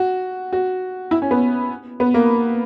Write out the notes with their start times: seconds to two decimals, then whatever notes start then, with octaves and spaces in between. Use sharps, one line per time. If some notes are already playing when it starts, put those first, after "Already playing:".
Already playing: F#4
0.53 F#4
1.11 E4
1.22 C#4
1.31 B3
2.00 B3
2.14 A#3